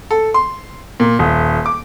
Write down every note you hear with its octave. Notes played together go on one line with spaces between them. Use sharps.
A4
C6
A#2
D#1
D6